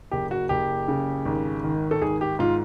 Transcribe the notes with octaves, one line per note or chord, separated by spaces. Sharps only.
F#1 G4
F#4
F#1 G4
C#3
G#1
D#3
A4
G#1 G#4
G4
G#2 F4